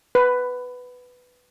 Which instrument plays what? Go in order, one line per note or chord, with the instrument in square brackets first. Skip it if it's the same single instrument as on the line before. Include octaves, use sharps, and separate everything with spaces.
[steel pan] B4